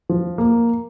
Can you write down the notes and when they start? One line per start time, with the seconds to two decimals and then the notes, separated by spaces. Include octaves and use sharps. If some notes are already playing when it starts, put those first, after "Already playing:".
0.09 F3
0.38 A#3